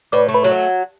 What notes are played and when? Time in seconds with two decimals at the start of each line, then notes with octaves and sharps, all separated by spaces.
0.12 A2 B4 D5
0.29 A3
0.34 B4
0.43 F#3 C#5